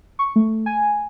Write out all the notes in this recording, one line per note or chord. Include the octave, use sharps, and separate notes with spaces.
C#6
A3
G#5